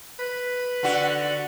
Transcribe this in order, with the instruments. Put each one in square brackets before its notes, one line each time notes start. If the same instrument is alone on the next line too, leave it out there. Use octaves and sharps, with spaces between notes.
[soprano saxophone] B4
[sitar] D3 F#4